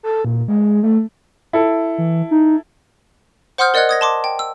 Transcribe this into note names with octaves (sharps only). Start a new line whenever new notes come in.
A4
A#2
G#3
A3
E4 A4
E3
D#4
C5 F#5 C6 D#6 F6 G6
A#4 D5 D#5 F#5 F#6 G#6
D#6 G#6 A#6
A5 C6 D6
G5
E6